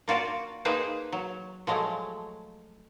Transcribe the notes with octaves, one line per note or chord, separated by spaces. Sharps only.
A#3 F4 F#4 D5
A#3 D#4 G#4 B4 C5
F#3
F3 F#3 G#3 A3